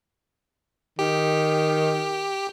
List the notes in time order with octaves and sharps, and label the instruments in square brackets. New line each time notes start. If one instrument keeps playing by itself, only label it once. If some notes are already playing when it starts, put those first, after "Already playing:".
[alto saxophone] D#3 [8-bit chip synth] G4